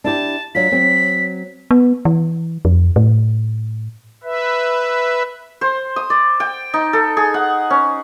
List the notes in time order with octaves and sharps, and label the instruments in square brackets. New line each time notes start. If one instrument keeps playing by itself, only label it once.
[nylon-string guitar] D4 E4 G4 [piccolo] A5
[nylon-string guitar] F#3 D4 F4 [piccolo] B6
[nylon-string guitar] F#3 C4
[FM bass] B3
E3
F2
A2
[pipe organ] B4 E5
[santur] C5
D#6
D5
G5
D#4
A4
G#4
F#5
C#4